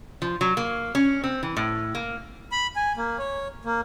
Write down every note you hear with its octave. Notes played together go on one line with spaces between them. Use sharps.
F3
F#3
A#3
C#4
C4
E3
A2
A#3
B5
G#5
A#3
C#5
A#3